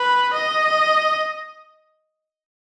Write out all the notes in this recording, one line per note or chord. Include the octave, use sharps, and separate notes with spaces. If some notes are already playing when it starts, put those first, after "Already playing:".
Already playing: B4
D#5